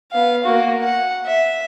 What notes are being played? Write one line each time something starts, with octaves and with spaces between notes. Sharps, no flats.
B3 F5
A#3 F#4
F#5
E5